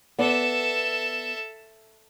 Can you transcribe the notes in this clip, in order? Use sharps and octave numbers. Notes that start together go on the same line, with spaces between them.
B3 A4 D5 E5